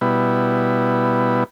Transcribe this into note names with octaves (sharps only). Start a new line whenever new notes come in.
B2 G3 B3 E4